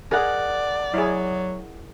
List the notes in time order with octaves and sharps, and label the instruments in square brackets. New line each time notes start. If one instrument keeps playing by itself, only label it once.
[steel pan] G#4 [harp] A#4 F#5 [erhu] D5
[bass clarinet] F#3 [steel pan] E4 G#4